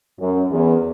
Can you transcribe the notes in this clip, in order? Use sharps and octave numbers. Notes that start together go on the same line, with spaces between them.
F#2
E2